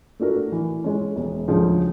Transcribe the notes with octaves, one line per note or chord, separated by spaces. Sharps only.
A3 D4 F#4 A#4
E3
G#3 C#4
E1
D2 C#3 F3 G#3